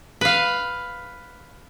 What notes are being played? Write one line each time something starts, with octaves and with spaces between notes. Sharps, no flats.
B4 F5